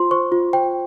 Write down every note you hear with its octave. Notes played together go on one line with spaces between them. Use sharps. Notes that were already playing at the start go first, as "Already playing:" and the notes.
Already playing: F4 C5 C6
C5 C#6
F4
C5 G5